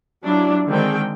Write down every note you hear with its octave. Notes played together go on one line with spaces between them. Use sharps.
F#3 D4 E4 F4
D3 D#3 G#3 C4 G#4 G5